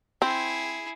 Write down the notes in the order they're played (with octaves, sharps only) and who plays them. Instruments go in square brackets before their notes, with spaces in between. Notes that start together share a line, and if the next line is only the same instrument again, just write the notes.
[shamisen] C4 [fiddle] E4 G#4